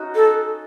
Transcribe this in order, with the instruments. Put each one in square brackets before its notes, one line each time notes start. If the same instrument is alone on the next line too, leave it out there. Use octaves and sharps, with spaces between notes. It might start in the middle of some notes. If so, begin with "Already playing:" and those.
Already playing: [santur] C#4 D#4 F#4 D#5
[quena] A4